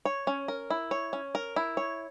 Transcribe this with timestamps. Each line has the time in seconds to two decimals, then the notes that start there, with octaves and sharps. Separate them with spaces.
0.05 C#5
0.27 C#4
0.48 A#4
0.70 E4
0.91 C#5
1.13 C#4
1.35 A#4
1.56 E4
1.77 C#5